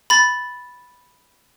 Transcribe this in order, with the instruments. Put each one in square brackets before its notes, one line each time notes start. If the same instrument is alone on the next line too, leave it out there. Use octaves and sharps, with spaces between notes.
[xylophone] B5 A6